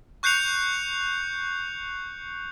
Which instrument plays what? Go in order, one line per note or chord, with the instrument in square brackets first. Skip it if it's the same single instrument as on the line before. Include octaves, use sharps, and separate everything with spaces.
[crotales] C#6 F#6 G6 C7 C#7 F7